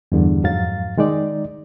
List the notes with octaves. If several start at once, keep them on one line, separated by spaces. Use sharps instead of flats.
E2 G2 D3
F2 G#2 F#3 F5 A6
D#3 G#3 D#4 D5